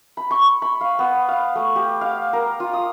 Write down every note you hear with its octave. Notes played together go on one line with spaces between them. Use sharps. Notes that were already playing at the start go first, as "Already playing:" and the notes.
B5
C#6
B5
F5
B3
F5
A3
G4
F5
A#4
F4
D#6